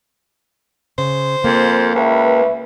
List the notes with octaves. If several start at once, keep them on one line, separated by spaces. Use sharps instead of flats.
C#3 C5
F2 A#3
C#2 B4 E5